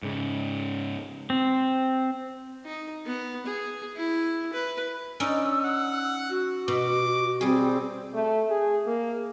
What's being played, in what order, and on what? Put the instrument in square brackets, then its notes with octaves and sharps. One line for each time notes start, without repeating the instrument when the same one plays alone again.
[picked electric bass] G#2 C#3
[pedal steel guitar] C4
[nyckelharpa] D#4
B3
G#4
E4
B4
[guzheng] C#4 D#4 D5 [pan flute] E6
[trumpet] F#5
[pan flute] F#4
[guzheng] B2 [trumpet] D6
[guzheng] G3 G#4 [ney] C4
[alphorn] A3
G#4
A#3